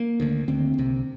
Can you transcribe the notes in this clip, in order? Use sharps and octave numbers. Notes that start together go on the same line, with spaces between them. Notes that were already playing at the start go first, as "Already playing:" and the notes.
Already playing: A#3
D2 D3
D2 D3 C4
C2 C3